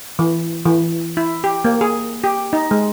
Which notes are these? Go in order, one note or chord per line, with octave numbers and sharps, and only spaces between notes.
E3
E3
E4
G4
A#3
G#4
G4
D#4
G#3